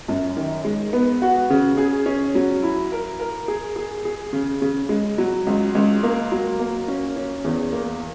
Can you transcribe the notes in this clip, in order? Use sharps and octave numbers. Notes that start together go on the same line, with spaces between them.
F#2
D#3
G#3
B3
F#4
C#3
G#4
C#4
F#3
E4
A#4
A#4
G#4
G#4
G#4
C#3
C#3
G#3
F#3
C#2
C#2
A#3
F#3
A#3
C#4
C#4
E2
A#3